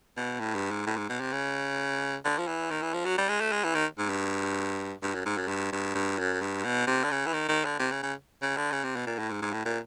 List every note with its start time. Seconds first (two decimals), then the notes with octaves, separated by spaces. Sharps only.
0.17 B2
0.40 A2
0.55 G2
0.71 G#2
0.86 A2
0.97 G#2
1.09 B2
1.20 C3
1.32 C#3
2.25 D3
2.38 F3
2.47 E3
2.71 D#3
2.82 E3
2.94 F3
3.05 F#3
3.18 G3
3.29 G#3
3.40 A3
3.52 G#3
3.64 E3
3.75 D#3
3.98 G#2
4.09 G2
5.03 G2
5.14 F#2
5.26 G#2
5.38 F#2
5.48 G2
5.72 G2
5.95 G2
6.19 F#2
6.41 G2
6.64 B2
6.87 C3
7.04 D3
7.11 C#3
7.27 E3
7.33 D#3
7.49 D#3
7.65 D3
7.79 C3
7.92 C#3
8.03 C#3
8.42 C#3
8.57 D3
8.72 C#3
8.84 C3
8.96 B2
9.07 A#2
9.19 A2
9.30 G#2
9.42 G#2
9.53 A2
9.65 A#2